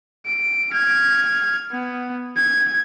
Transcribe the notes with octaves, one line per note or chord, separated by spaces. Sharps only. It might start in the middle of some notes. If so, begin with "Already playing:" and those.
D7
F6 G#6
B3
G#6